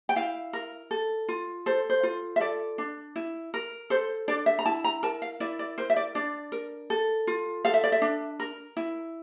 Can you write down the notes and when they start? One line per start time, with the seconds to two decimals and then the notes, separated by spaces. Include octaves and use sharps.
0.09 G5
0.16 E4 F5
0.53 A#4
0.91 A4
1.28 F4
1.66 A4 C5
1.90 C5
2.03 F4
2.36 E5
2.40 A4 D5
2.78 D4
3.16 E4
3.54 A#4
3.90 A4 C5
4.28 D4 D5
4.46 E5
4.59 A#5
4.65 E4 A5
4.84 A#5
5.03 A#4 A5
5.22 F5
5.40 E4 D5
5.59 D5
5.78 A#4 C5
5.90 E5
5.96 D5
6.15 D4 D5
6.52 A#4
6.90 A4
7.27 F4
7.65 A4 F5
7.74 E5
7.84 D5
7.92 E5
8.02 D4
8.40 A#4
8.77 E4